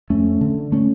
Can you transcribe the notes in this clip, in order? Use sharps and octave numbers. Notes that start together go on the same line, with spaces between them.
F2 A3 C#4
D3
A3 C#4